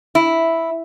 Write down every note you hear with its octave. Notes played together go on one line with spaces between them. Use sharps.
E4